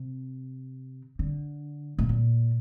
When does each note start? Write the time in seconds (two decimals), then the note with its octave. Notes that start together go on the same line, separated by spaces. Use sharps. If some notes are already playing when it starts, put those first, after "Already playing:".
Already playing: C3
1.19 D3
1.99 A2
2.09 A#2